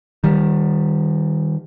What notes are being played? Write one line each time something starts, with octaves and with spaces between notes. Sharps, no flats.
D#3 G3